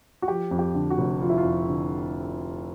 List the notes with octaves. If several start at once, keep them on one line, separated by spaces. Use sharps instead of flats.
F#4
F3 G4
F2
G4
D3
F#4
F1
F3 F4
E4
F4
F2
D3